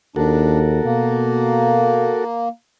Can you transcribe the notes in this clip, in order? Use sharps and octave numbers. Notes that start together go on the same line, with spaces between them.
D#2 D4 F#4 A4 A#4
B2 A#3